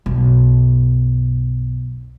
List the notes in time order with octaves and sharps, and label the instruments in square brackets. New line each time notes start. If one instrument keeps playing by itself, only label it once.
[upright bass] B1 F#2